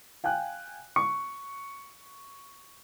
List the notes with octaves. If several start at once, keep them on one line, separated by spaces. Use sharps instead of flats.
F5 G5 G#5 F#6
C#6 C#7